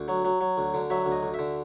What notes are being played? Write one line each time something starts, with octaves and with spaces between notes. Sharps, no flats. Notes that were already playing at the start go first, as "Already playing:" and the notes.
Already playing: D2
F#3
F#3
F#3
D2
D3
F#3 E5
D2
D#5
D2
D3 E5